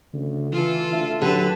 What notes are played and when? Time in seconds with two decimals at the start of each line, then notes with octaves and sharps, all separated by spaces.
0.13 D2 C#3
0.52 E3 F4 A4
0.93 D2 E5
1.22 D3 F#3 G4 A4 B4